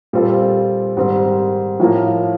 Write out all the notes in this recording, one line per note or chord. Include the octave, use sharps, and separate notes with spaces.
A#2 G3 C4 F4 A4
G#2 D#3 G3 C4
A2 F3 A#3